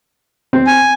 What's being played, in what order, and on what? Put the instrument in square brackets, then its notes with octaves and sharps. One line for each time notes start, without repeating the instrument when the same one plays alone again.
[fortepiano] C4
[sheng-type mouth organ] G#5